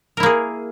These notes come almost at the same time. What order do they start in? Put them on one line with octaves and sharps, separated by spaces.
A#4 E4 A#3 G#4